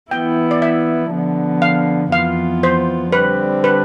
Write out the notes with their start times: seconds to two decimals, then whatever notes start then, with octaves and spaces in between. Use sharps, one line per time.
0.11 E3 B3 E4 G5
0.51 D5
0.62 E5
1.11 D3 F3 B3
1.62 F5
2.12 F2 E3 B3 F4 F5
2.63 C5
3.13 D3 G3 C4 B4
3.64 B4